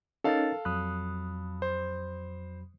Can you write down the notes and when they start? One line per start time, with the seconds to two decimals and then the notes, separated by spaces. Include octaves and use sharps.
0.24 C#4 D#4 A4 A#4 F5 A6
0.65 F2 F#3 B5 D#6 F#6
1.62 C5